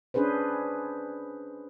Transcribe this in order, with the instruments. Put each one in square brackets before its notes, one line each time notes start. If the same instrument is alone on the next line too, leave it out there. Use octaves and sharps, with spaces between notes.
[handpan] C#4 D4 G#4 B4 C5